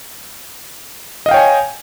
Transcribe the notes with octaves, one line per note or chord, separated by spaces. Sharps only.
C#5 D#5 F5 G5 G#5